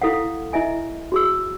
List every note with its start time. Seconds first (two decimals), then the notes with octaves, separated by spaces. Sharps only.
0.02 E4 A4 F5 F#5
0.53 E4 D#5 E5 G#5
1.12 F#4 G#4 E6